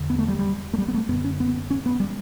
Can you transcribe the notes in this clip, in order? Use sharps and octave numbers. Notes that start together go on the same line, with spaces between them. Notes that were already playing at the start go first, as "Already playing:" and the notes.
Already playing: E2 D3
B3
A3
G3
G3
A3
G3
B3
A3
F#2 D3 B3
C#4
B3
C#4
B3
G3